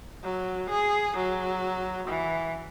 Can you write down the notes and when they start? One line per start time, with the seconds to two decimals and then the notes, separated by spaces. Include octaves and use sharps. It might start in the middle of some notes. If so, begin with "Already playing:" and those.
0.24 F#3
0.70 G#4
1.17 F#3
2.08 E3